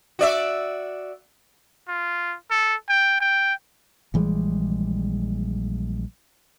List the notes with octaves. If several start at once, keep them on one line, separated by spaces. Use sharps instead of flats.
F#4 D5 E5
F4
A4
G5
G5
A#1 E3 G3 G#3